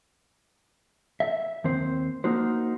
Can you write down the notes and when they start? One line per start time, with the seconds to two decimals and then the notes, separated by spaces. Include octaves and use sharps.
1.20 E5
1.64 D#2 C4 C5
2.24 A#3 D#4 F#4 C5